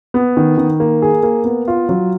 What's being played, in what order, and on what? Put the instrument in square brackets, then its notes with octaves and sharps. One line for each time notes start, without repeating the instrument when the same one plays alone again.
[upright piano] B3
D#3
D#3
A#3
G#4
A#3
B3
F4
F#3